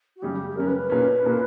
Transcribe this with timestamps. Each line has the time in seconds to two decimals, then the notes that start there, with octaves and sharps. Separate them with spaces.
0.17 F#4
0.22 F#2 C#3 G3 C#4 G4
0.50 G4
0.56 F#2 C#3 G3 C#4 A#4
0.67 B4
0.79 B4
0.90 A#2 A#3 C#4
1.23 A#2 A#3 C#4